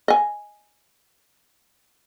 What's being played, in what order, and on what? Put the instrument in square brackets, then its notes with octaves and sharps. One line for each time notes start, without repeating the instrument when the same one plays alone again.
[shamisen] D#5 G#5